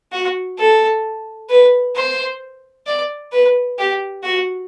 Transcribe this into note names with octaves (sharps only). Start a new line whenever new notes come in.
F#4
A4
B4
C5
D5
B4
G4
F#4